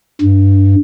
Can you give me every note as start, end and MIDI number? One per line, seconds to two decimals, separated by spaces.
0.21 0.76 43